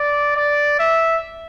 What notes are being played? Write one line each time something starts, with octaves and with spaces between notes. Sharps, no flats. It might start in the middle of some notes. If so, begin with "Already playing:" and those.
Already playing: D5
D5
E5